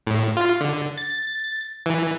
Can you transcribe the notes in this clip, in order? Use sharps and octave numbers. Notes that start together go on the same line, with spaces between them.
A2
F4
D3
A6
E3